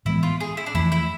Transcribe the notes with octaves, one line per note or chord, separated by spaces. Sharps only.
A2 E3 G#3 B3 E4
F4
G#4
E4
D4
F2 E3 A3 E4
E4